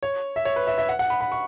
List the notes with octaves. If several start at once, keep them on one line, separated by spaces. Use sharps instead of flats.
C#5
E5
C#5
B4
E5
E5
F#5
F#5
B5
B5
C#6